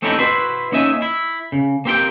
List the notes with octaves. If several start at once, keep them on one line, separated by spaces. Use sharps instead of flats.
A3 C4 C#4 D#4 E4 G4
E4 F#4 B4 C5
A#3 C#4 D#4 E5 G#5
E4
C#3
A#3 C4 G4 A#4 G5